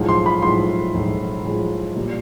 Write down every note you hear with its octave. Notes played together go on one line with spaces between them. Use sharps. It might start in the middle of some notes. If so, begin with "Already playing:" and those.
Already playing: B1 A2 F3 G#3
C6
B5
B1 A2 F3 G#3 C6
B1 A2 F3 G#3
B1 A2 F3 G#3
A#2 G3